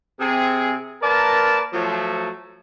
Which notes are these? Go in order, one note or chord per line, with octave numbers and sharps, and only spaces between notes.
C3 C4 G#4
A#3 A#4 B4 D5 A5
F3 F#3 A3